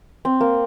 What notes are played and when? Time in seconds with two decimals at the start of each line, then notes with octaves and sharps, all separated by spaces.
0.25 C4
0.40 A#3